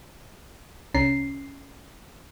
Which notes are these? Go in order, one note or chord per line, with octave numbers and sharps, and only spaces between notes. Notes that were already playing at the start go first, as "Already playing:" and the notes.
C2 C#4 A#5 C7